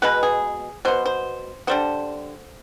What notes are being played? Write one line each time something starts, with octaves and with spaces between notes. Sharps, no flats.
B2 G#3 B3 B4
G#4
B2 B3 C5
C5
D3 G3 B3 C5